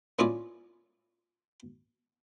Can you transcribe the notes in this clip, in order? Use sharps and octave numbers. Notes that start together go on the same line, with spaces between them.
A#3 C#4 E4 F4 C#5 D5